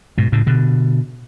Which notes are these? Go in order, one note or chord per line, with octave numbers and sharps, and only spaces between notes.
G#2 B2
A2 C#3
B2 D3